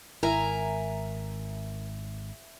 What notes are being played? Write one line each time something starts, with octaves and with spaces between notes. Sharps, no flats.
G#1 E4 A#4 E5 G#5 A#5